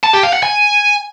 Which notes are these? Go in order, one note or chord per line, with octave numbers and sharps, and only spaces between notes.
A5
G4
F5
F#5
G#5